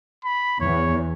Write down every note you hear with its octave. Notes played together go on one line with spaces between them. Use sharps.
B5
E2 C#5